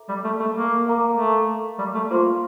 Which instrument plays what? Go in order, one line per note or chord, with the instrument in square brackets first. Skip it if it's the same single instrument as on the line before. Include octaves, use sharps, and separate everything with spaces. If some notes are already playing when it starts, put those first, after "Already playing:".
Already playing: [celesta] A4 E5 A#5 D6
[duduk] G3
A3
A3
A#3
[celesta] A#4 F5 A#5 D6
[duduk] A3
G3
A3
[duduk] A#3 [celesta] F4 C5 F5 C6